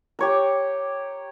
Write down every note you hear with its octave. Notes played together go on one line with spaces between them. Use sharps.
G4 C#5 A#5